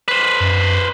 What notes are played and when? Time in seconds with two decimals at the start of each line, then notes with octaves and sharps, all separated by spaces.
0.08 B4 C5
0.40 F#2